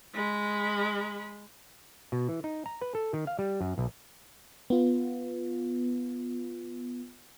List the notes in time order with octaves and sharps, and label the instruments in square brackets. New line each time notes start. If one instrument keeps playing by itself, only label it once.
[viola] G#3 B5
[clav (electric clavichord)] B2
E3
D#4
A#5
B4
A4
D#3
F5
G3
F#2
B1
[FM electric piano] B3 F4